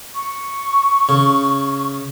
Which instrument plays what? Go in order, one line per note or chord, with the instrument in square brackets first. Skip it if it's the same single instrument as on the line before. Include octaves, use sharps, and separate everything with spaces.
[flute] C#6
[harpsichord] C#3